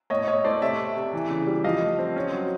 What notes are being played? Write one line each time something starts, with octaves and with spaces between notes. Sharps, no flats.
A2 C#5 D#5
A2 C#5 D#5
A3 C5 D5
C3 D5 E5
C3
C3
E3
C#3
G3
F3 D#5 F5
A3
C4
C#4
F#3